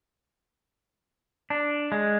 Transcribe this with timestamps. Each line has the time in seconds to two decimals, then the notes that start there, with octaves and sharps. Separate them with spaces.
1.50 D4
1.92 G#3